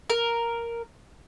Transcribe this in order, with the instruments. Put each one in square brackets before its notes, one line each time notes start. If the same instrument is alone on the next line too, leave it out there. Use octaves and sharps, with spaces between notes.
[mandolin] A#4